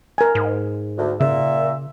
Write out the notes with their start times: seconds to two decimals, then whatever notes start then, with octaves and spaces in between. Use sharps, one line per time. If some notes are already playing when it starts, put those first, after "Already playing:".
0.18 A#4 G#5
0.35 G#2
0.98 D2
1.20 A#2 C#3 E5